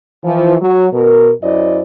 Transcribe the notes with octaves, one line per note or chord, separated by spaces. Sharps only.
E3 F3
F#3
B2 A#4
F#2 E4 C5 D5 D#5